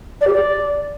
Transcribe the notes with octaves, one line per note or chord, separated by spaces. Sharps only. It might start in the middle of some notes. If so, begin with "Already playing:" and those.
D5
G4
D5